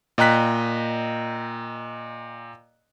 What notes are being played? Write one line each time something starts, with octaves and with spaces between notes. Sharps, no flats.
A#2 D#5 G5 A#5 F#6 B6